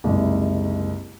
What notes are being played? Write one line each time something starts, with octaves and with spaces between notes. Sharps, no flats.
F#1 C2 G#2